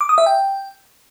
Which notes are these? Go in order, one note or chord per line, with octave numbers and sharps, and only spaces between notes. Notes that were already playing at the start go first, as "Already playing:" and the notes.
D6
D#6
E5
G5